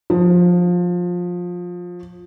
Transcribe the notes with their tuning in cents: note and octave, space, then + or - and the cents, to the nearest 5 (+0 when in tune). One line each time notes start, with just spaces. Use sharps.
F3 +20